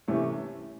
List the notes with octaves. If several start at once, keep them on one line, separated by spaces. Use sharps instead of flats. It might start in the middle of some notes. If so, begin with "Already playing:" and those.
C3 E3 A3 C#4